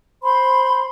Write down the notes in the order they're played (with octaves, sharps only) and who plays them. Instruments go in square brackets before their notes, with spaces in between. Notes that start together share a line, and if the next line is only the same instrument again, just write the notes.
[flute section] C5 B5 C6